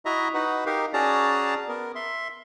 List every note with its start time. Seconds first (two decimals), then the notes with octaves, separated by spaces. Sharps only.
0.05 E4 F#4 D#5 E5 A#5
0.34 D#4 F#4 B4 F#5
0.66 D#4 G4 A#4 F5
0.93 C#4 F#4 G#4 D5 A5 A#5
1.69 B3 A#4
1.95 E5 C6